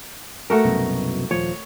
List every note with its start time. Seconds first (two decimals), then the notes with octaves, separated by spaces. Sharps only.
0.50 A3 F#4 A#4
0.65 C2 F#2 B2
1.31 D#1 F3 C#5